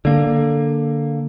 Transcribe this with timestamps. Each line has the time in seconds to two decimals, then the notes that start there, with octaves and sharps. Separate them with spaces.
0.05 D3 A#3